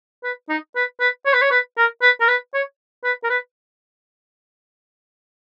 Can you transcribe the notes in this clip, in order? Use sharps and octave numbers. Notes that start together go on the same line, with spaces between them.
B4
D#4
B4
B4
C#5
B4
C#5
B4
A#4
B4
A#4
B4
C#5
B4
A#4
B4